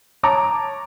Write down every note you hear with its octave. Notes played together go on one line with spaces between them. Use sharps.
C#5 A5 A#5 D6